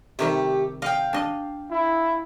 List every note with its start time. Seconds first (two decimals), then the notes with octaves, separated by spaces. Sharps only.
0.19 C3 D#3 G3 A3 G4
0.82 D#5 F5 G5
1.13 D4 D#5
1.71 E4